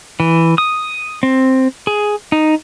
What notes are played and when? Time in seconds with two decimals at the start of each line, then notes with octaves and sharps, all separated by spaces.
0.20 E3
0.58 D#6
1.23 C4
1.87 G#4
2.32 D#4